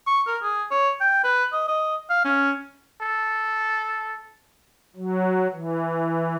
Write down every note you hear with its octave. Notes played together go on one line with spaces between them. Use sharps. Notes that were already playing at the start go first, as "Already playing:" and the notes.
C#6
A#4
G#4
C#5
G5
B4
D#5
D#5
F5
C#4
A4
F#3
E3